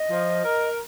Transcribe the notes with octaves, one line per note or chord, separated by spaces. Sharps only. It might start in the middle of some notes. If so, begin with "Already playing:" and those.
Already playing: D#5
F3
A#4